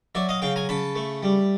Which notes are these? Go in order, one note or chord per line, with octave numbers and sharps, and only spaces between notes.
F#3 D5 E5
D#5 F5
C#3 F5 G5
G#5 A#5
C#3 A5 B5
A3
G3